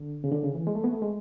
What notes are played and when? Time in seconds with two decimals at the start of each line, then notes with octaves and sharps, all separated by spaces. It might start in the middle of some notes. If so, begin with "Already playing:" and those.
Already playing: D3
0.24 C#3
0.32 D3
0.43 C#3
0.55 E3
0.67 G#3
0.75 A3
0.84 B3
0.93 A3
1.02 G#3